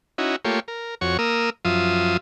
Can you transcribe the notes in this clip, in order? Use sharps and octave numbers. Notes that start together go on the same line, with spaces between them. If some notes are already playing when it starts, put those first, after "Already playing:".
C#4 D#4 E4 F#4
A3 A#3 F4 G4 C#5
A#4
F2 F#4 C#5 C#6
A#3 A#4 D#6 E6
F#2 F3 F4 E5 D#6